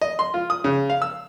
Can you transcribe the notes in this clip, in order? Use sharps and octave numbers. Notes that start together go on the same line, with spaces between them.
D#5
C6
F4
D#6
C#3
F5
E6